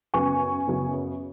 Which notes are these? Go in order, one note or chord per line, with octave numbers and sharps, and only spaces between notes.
F#2 C#3 B3 G#5 C#6
F#2 C#3 B3